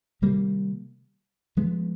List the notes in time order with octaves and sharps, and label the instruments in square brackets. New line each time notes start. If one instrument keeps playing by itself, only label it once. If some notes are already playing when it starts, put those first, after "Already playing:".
[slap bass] C3 D#3 G3 A#3
F3 G#3 B3